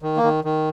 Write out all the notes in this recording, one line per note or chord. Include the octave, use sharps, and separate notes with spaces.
D#3
A#3
D#3
D#3